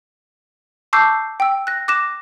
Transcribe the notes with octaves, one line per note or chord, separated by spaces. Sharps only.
A5 C#6 D6 E6 G6 C7
G5 E6
F#6 A#6
D6 F#6 A#6 E7